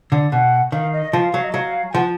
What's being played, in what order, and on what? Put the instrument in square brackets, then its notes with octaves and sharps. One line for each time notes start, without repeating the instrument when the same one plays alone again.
[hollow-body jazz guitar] D3
[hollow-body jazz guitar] B2 [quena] F#5
[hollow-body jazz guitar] D#3 [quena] F5
[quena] D#5
[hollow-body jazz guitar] F3 [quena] F5
[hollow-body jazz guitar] F#3
[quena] D#5
[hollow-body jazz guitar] F#3 [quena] F5
[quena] G#5
[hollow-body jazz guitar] F3 [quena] F#5